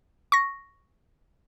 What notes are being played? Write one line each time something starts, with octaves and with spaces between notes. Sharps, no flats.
C#6 A#6